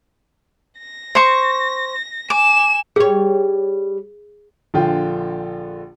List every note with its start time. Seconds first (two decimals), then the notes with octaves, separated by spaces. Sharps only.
0.79 A#6
1.15 C5 C#6
2.30 G#5 D6 E7
2.96 G3 G#4 C#5
4.74 A#1 D3 F4 G5